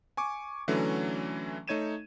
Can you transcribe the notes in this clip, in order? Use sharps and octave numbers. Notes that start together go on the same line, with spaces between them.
G#5 C#6 D6
D3 E3 F#3 A3 C#4
A3 D#4 C#5 G#6 D#7 E7